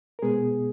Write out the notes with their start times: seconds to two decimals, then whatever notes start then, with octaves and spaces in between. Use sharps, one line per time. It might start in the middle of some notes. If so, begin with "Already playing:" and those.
0.19 A#4
0.22 B2 G#3 B3 G#4